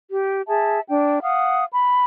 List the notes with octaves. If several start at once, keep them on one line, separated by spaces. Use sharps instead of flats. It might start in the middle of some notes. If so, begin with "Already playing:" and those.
G4
G#4 E5 A5
D4 G5
F5 F#5 D#6
B5